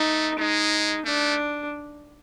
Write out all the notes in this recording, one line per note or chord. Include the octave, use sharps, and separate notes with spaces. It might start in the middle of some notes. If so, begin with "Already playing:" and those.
Already playing: A3 D#4
G#3 D#4
A3 D4